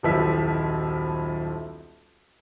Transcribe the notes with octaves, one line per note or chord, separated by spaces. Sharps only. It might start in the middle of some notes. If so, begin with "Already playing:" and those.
D#1 B1 F3 E4 B6